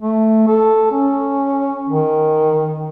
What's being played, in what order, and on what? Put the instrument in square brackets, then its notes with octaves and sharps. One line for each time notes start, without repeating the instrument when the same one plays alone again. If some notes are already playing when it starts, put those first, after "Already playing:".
[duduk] A3
A4
C#4
D#3